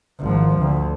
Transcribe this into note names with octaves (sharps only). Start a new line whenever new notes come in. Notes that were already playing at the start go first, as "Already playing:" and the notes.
G#1 F3
D2